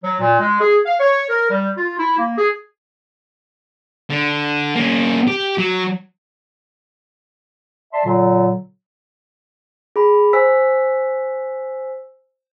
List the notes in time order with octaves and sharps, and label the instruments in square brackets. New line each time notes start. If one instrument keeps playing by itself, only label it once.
[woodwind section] F#3
A#2
G#3
G#4
F5
C#5
A#4
G3
F4
E4
A#3
G#4
[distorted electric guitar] D3
A#3 C#4
G4
F#3
[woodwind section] D5 E5 A5 C6
A#2 D3 F#3
[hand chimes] G#4 B5
C5 G#5 E6 B6